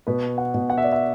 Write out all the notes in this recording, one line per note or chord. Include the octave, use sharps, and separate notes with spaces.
B2 B4
F#5
B2
F#5
E5
D5
E5